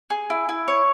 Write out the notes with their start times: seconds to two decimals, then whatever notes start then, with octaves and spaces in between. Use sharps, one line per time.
0.10 G#4
0.30 E4
0.49 E4
0.68 C#5